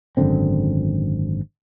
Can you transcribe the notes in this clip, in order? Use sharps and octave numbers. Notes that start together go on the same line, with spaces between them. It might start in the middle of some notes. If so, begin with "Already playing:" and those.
G#1 F#2 D3 C4